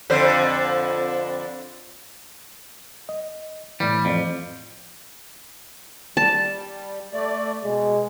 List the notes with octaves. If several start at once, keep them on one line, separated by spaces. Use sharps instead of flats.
F2 D3 C5
D#5
A2 E3 G3
F2
G3 A5
A3 D5
B2 G#3